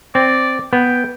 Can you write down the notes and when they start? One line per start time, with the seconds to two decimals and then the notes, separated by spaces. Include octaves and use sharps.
0.15 C4 D5
0.73 B3 G5